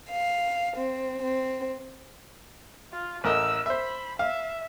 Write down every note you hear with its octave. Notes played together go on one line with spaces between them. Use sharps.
F5
C4
C4
F4
A1 A#4 D#5 E6
C5 E5 B5
E5 F5